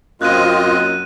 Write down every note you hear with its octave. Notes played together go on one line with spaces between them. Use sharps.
F#2 A#3 C4 F4 D#5 F#6 D#7